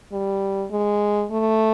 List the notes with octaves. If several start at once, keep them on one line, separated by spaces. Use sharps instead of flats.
G3
G#3
A3